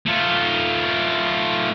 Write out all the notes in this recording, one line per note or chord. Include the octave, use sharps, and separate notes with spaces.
A3 F4